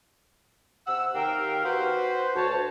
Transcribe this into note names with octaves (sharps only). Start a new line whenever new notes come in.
C3 F#5 E6
D#2 G4 A#4 F5 G5
F#4 B4 C5
D2 F#4 C#5 A5